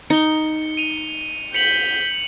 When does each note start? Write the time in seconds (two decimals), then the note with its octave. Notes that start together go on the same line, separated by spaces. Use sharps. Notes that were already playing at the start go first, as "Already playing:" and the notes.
0.10 D#4 C#7 G7
0.77 D#7 F7
1.54 G6 B6 C#7 F7 F#7